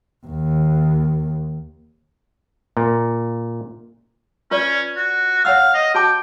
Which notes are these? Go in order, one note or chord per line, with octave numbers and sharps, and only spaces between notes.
D#2
A#2
C#4 F4 B4 D5
F#4
C#5 F5 F#5 E6
D#5
F#4 G5 A5 D6